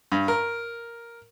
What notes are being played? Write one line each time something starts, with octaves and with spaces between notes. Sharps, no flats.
G2
A#4